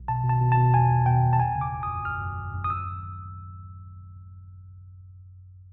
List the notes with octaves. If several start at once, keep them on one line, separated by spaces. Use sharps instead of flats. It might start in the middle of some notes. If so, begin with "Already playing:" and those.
Already playing: B1
B2 A5
B2
A5
B2
A5
B2
E2 G#5
E2
B2 G5
E2
A5
G#1 G#5
C#3
D6
G#1
F#2 D#6
G#1 F6
F#2
G#1
F#2
D#6
E6